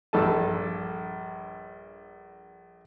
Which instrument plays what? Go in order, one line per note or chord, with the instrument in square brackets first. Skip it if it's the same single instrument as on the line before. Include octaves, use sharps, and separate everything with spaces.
[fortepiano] A#1 G2 A4 A5